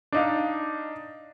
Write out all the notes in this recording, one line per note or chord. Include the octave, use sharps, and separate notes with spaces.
D4 D#4 F5